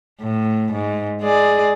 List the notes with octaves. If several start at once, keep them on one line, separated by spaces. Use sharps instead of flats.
A2
G#2
G#3 G#4 D5